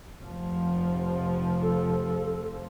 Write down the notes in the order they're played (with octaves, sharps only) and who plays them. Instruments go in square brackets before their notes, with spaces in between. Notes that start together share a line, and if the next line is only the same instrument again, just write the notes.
[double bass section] F1 F3
[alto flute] A4